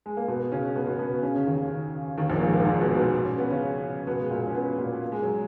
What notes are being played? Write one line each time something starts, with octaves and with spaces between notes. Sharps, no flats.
G#3
A#3
B2 B3
C#3 C#4
B2 B3
B2 B3
B2 B3
C#3 C#4
C#3
D#2 D#3
D#2 D#3
A#1 A#2
A#3
G#2 G#3
A#2 A#3
G#2 G#3
B2 B3
B2 B3
C#4
B3
C#3 C#4
B2 B3
G#3
A#2 A#3
C#4
B2 B3
A#2 A#3
A#3
G#3
F#3